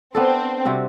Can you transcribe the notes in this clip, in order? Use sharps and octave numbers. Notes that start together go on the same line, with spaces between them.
B3 C4 D4 A4
C3 G3 C4 F#4